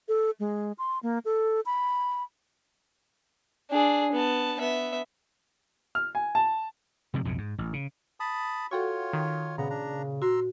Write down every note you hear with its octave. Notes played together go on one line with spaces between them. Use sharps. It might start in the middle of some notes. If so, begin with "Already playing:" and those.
A4
G#3
C6
A#3
A4
B5
D4 G#4
B3 A5
B3 E5
F6
G#5
A5
C3 F3 G#3
B1 F2 A2 C3
G#2
A1
C#3
A5 B5 D#6
F4 F#4 A4 C#5 F#5 G5 C#6
D#3
A#2 C#3 B3 A#5
D4 A#5
F#4 A#5 C6 E6